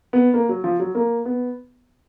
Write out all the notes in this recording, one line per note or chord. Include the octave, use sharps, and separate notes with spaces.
B3
A#3
F#3
F3
F#3
A#3
B3